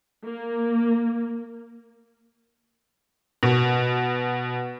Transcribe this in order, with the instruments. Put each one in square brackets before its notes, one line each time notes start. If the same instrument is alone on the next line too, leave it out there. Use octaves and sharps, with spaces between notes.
[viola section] A#3
[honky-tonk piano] B2